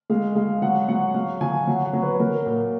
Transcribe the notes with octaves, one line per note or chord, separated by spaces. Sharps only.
G#3 F5
G#3 F5
F#3 F#5
F#3 F#5
F#3 F5
F#3 G#5
F#3 F#5
F#5
F#3
B4
F#3 A#4
A#2